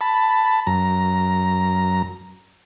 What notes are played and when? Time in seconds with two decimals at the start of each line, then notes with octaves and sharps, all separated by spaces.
0.01 A5 B5
0.67 F#2 A#5